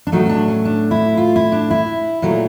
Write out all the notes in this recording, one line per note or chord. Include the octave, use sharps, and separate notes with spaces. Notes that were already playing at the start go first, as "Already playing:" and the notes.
D4
A2 F#3 A3 D#4
C#4
D4
C#4
D4
E4
F4
E4
D4
E4
A#2 F#3 A3